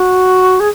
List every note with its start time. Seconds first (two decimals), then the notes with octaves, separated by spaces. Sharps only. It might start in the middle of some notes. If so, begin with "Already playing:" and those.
Already playing: F#4
0.60 G#4